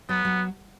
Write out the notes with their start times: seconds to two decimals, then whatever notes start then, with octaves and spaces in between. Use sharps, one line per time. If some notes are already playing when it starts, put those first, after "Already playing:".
0.09 F#3 B3
0.25 F#3